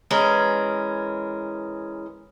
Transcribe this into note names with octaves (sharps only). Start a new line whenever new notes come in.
E3 G#3 C#4 A#4